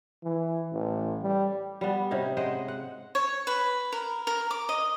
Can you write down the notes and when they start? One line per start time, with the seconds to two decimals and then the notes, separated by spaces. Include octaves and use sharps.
0.23 E3
0.72 A1
1.22 G3
1.81 G3 B3
2.11 C3 C#4 D#4
2.37 G#3 C5 D#5 F#5
2.68 F#5
3.15 C#5
3.47 B4
3.92 A#4
4.27 A#4
4.51 D6
4.69 D#5